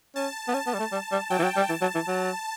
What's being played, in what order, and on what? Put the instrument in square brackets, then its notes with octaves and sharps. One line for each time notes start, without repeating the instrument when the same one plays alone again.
[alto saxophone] C#4 [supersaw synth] A5
[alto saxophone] B3
[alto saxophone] C#4 [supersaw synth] A5
[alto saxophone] B3
G3
A3
G3
G3
[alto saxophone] F#3 [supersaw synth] G5
[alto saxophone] E3
F#3
G3
[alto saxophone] E3 [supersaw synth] A5
[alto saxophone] F#3
E3
F#3